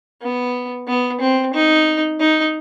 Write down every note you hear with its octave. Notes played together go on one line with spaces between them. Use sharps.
B3
B3
C4
D#4
D#4